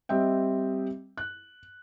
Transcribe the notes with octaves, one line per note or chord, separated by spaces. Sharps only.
G3 C4 D#5 E5 G5
F#6